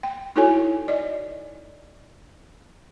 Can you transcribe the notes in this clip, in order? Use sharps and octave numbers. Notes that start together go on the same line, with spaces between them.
G5
D#4 E4 F#4 A4 C#5 G#5
D5 D#5